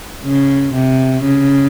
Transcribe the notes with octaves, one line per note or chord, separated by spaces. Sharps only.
C#3
C3
C#3